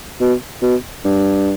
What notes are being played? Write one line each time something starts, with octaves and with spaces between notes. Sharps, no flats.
B2
B2
G2